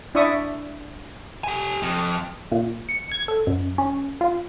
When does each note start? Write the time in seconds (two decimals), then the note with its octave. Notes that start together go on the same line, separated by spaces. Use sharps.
0.15 D4 E4 D5 E5 C#6 D#6
1.44 G4 G#5
1.83 F2
2.52 A#2
2.89 C#7
3.12 G#6
3.28 A4
3.47 F#2
3.78 C#4
4.21 F4